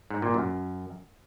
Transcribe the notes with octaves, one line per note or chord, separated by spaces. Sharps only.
G#2
A#2
F#2